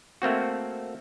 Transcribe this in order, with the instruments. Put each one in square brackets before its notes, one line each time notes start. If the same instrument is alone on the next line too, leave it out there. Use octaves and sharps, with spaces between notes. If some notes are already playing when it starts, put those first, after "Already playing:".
[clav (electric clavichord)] A3 A#3 C4 F#4